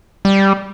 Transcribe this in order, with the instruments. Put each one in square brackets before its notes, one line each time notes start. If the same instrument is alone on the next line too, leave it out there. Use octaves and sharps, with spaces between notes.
[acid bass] G3